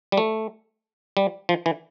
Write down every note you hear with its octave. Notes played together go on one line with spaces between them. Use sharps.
G3
A3
G3
F3
E3